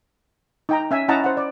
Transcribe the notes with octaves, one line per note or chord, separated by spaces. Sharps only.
D#4 G5 A#5
C#4 E5 G#5
C#4 E4 D#5 F#5 A5 A#5
C5 F#5
D5